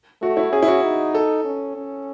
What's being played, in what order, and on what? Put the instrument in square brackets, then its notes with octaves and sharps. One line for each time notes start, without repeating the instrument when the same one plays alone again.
[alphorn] A3 [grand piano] F#4
[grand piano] E4
[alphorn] C#4 [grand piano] G#4
[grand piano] E4
F#4
[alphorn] D#4
[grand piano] A4
[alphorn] C#4
C#4